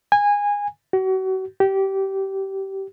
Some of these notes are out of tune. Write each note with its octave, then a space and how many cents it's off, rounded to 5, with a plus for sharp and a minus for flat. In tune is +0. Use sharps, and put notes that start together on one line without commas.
G#5 -20
F#4 +35
G4 -20